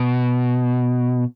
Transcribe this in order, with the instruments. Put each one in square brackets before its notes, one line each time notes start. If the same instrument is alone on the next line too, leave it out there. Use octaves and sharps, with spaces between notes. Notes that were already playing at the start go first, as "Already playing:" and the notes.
Already playing: [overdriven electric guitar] B2